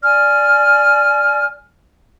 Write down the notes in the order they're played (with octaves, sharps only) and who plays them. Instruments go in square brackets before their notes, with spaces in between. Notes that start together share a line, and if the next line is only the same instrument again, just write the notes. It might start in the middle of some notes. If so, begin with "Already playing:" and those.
[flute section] D5 G#5 F6